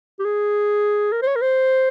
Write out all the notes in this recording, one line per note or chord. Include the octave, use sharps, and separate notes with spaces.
G4
G#4
A#4
C5
C#5
A#4
C5